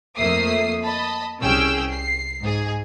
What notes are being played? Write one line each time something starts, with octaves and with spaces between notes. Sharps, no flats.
F2 A3 A#3 E5 D#6 C7
D#5 A5 B5
C2 C#4 G#4 G5 E6
C7
G#2 G#4